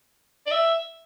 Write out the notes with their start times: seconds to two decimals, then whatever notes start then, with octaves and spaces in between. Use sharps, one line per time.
0.46 D5
0.51 E5